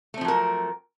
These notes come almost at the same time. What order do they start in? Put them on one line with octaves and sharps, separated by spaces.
A3 C4 F3 F#3 A#4